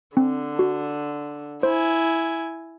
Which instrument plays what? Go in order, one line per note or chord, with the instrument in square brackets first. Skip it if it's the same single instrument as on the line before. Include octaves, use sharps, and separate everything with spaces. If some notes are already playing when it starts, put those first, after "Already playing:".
[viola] D3 [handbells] C4
[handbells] F#4
[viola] E4 G#5 [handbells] C5